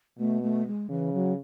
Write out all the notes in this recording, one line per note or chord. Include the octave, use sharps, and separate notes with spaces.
B2 A3
A3
G#3
C#3 E3
F#3